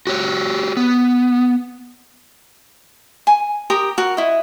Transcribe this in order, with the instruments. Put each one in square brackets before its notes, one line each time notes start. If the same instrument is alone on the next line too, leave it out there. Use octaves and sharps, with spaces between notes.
[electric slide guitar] F#4 G4 C#5
B3
[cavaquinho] G#5
G4 A#4 D#6
F#4 A#4
E4 D#5